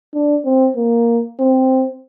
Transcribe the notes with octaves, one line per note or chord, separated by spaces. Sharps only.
D4
C4
A#3
C4